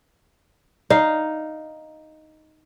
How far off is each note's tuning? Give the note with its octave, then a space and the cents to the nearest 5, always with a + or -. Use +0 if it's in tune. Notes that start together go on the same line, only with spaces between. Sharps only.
D#4 +0 F5 +0